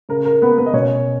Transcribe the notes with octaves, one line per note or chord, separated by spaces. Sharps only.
C#3 A#4
A#4
A#3 B3 B4
B3 B4
D#5
B2 C#4 C#5